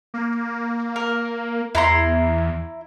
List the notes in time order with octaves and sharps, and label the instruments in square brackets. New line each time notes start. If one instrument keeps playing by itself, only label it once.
[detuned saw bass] A#3
[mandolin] A#4
[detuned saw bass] E2 [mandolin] E4 A#5 C6